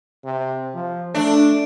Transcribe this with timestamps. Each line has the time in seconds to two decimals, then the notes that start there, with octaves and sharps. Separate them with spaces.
0.24 C3
0.75 F3
1.14 A3 D4